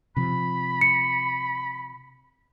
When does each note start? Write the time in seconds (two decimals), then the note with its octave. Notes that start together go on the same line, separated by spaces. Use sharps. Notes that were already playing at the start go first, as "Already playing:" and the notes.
0.17 C3 F3 B5
0.81 C#7